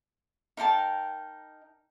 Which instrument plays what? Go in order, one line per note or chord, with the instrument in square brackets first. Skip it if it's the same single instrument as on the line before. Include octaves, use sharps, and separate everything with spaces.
[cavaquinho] D#4 A#4 G5 A5